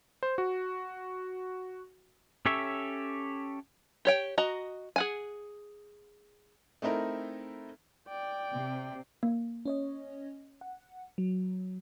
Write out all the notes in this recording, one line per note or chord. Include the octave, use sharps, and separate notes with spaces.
C5
F#4
C#4 G4 A4 C#5 E5
G4 C#5 G5
F#4 D#5 A#5
G#4 F#5 G#5
A3 C4 D#4 E4 A#4
D5 G5
C3
A#3
C#4 C#5 D#5
F#5
F#3